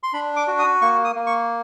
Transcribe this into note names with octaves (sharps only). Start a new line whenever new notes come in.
C6
D4 B5
D6
F#4
D#6
A#3 C#6
D#6
A#3
C#6